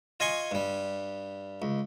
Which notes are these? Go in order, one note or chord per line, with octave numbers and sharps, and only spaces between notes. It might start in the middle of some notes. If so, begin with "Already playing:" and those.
F4 D#5 G#5 C6 C#6
G2 G3
C#2